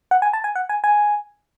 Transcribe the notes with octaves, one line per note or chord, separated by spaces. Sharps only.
F#5
G#5
A5
G#5
F#5
G#5
G#5